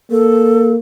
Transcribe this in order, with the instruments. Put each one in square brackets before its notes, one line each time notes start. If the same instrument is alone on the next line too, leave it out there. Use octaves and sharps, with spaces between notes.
[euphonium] A#3 [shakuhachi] A4